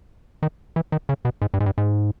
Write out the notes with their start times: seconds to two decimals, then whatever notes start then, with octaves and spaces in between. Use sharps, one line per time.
0.43 D#3
0.76 E3
0.92 D#3
1.09 C#3
1.25 B2
1.42 G#2
1.54 G2
1.60 G#2
1.66 G2
1.78 G#2